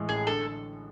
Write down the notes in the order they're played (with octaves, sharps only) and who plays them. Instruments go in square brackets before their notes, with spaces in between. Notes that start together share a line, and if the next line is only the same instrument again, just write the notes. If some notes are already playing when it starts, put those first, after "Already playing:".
Already playing: [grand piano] A2 E3 G#3
[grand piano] A1 [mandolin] G#4
[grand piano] D3 [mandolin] A4